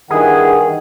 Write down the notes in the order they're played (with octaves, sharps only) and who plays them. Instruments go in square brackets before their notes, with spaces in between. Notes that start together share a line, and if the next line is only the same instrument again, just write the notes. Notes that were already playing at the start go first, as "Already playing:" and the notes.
[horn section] G2 E4 F#5 [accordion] D#3 [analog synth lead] G#4